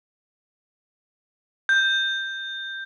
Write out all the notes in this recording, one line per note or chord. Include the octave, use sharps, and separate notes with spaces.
G6